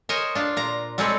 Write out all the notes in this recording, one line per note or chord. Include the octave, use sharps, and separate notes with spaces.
A#4 C5 C#5 D#5 G#5
D4 F4
A#2 A#5
G3 G#3 C4 G#4 A4 C#5